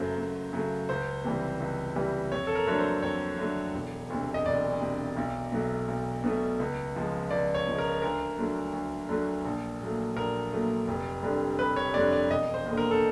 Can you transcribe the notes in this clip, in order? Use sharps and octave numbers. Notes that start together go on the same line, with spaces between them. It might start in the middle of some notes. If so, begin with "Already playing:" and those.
Already playing: F#2 C#3 F#3 A3 C5
F#2
C#3 F#3 A3
C#2 C5
C3 E3 G3
C#2
C3 E3 G3
F2 C#5
A4
A#4
D3 F#3 A3 C#5
C5
F2 C#5
D3 F#3 A3
E1
D2 C3
D#5
E1 D5
D2 C3
B1
B2 F#3 A3
B1
B2 F#3 A3
C#2
C#3 F3 G#3
C#2 D5
C#5
C#3 F3 G#3
A#4
D2 A#4
D3 F#3 A3
D2
D3 F#3 A3
A#1
A#2 F#3 A3
A#1 A#4
A#2 F#3 A3
F1
F2 D3 G3
F1 B4
C#5
F2 D3 G3 D5
D5
E1 D#5
C5
D#2 D3
A#4
A4